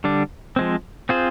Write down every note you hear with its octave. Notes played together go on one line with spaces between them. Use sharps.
D3 G3 D4
F3 G#3 C4
C4 F4 G#4 C5